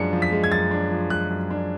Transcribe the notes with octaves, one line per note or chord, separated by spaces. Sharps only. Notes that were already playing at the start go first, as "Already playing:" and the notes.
Already playing: F#2 F3 G#3 D4 C#7
F3
B6
G#3
G#6
F#2 A6
D4
F3
G#3 F#6
F#2
D4